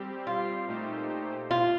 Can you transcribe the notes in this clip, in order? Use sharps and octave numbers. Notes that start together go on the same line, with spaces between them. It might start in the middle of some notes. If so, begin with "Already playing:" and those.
Already playing: G3 C4 G4
F4
A#2 A3 D#4 G4 C5
F4